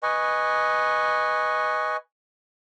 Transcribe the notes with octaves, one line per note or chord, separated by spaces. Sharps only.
B4 D#5 G#5 C#6